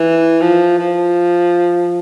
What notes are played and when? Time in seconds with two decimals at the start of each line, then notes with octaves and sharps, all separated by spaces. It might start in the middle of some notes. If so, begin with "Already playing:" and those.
Already playing: E3
0.41 F3
0.79 F3